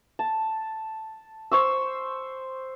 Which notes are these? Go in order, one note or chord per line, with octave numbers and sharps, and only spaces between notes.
A5
C5 C#6 E6